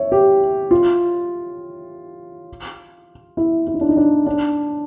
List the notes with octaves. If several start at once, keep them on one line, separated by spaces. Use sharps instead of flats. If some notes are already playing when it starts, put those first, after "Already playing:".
Already playing: C#5 E5
G4
F4
E4
E4
D#4
D4
D#4
D4
D4